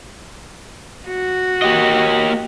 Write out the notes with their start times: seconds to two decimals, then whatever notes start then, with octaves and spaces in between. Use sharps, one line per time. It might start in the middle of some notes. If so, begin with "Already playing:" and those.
1.07 F#4
1.62 A#3 G4 D#5